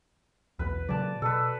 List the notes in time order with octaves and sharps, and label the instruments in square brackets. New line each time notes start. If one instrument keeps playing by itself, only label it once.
[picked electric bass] B1 E2 [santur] B4
[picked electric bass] A#2 C#3 F#3 [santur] D5 A5
[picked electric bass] B2 [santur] A4 B4